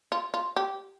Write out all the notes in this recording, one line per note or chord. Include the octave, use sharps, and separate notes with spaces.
F4
F4
G4